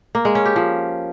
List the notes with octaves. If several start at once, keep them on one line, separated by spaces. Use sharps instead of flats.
A#3
G#3
C#4
G4
F3